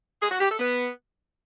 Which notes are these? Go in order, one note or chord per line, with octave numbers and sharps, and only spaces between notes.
G#4
F#4
G4
A4
B3